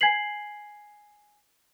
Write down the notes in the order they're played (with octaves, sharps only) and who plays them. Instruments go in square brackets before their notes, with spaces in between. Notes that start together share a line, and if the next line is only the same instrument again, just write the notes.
[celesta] G#5 G#6 B6 C7 F#7